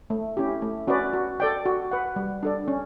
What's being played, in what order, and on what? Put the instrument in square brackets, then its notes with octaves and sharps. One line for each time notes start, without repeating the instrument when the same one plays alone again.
[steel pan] A3
C#4 E4 G4
A3
C#4 F#4 B4 D5
F#4
A4 D5 G5
F#4
B4 F#5
G3
D4 A4 D5
C#4